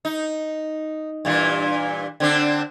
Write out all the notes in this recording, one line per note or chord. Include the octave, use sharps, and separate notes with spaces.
D#4
G2 A#2 E3
D3 C4 D4